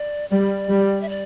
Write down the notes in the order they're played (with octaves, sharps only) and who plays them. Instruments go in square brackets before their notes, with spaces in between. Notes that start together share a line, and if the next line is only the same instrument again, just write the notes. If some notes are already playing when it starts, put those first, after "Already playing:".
Already playing: [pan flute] D5
[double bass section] G3 [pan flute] D5
[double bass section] G3
[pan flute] E5
D5